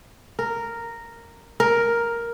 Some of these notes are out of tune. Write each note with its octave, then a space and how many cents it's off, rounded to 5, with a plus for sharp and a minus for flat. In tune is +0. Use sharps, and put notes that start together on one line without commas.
A#4 -5
A#4 +5